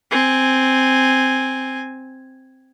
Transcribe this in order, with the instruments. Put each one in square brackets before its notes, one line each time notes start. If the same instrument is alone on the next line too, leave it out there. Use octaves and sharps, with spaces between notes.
[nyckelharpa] C4 G#5